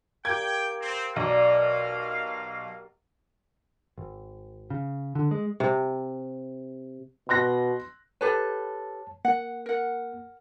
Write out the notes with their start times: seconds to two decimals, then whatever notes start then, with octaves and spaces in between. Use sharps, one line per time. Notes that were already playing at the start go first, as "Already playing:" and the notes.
0.25 A#3 G4 G5 G#6
0.81 C4
1.16 B1 D5 F5 A#5 C#6
3.98 G#1
4.70 C#3
5.15 D3
5.31 G#3
5.60 C3
7.29 B2 C6 F#6 A#6
8.21 G4 A4 B4 C#5 A5
9.25 A#3 F#5
9.66 A#4 F#5